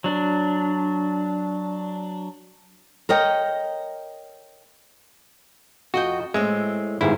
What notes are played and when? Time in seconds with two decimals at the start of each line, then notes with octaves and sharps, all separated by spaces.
0.04 F#3 D4
3.09 A#4 C#5 D#5 G5
5.94 F2 F#4 D#5 G5
6.34 A2 G#3 C4 E5
7.01 G1 G#2 G#3 E4 C5